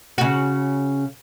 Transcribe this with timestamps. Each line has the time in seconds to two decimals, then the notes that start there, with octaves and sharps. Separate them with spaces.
0.18 C#3 F#4